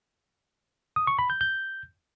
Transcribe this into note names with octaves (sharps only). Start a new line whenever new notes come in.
D#6
C#6
B5
G6
G6